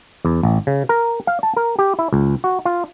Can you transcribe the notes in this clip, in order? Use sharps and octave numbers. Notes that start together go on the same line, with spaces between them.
E2
A1
C#3
A#4
F5
A5
A#4
G4
E4
C#2
F#4
F4